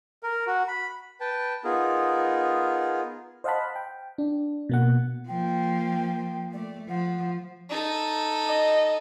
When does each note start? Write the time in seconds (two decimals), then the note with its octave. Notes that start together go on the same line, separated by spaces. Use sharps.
0.23 A#4
0.47 F#4
0.68 B5
1.21 B4 G5 A5
1.64 B3 D#4 F4 G#4 A#4
3.44 C5 D#5 F5 F#5 A5 B5
3.76 G5
4.18 D4
4.69 B2 A#3 F#5
5.28 F3 A#3 G5
6.53 A3 D5
6.89 F3 F#5
7.69 D#4 A4
8.46 D#5